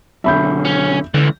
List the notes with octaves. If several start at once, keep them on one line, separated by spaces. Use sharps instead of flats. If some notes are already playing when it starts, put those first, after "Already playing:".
F#2 B2 D3 E5 B5 G6
C#4
C#2 D3 E3